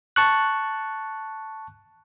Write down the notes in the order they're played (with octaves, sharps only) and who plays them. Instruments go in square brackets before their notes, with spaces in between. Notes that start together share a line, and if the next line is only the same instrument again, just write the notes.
[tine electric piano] A5 C#6 F#6